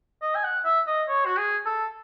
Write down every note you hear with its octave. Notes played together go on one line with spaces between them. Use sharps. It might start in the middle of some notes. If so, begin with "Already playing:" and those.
D#5
G#5
F#5
E5
D#5
C#5
F#4
G#4
A4